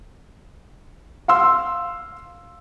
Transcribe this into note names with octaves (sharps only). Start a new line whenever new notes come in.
F5 C6 E6